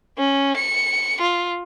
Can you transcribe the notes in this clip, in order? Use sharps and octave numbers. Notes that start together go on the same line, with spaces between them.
C#4
C#7
F4